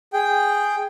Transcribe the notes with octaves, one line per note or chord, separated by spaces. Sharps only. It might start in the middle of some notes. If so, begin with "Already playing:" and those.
G#4 G5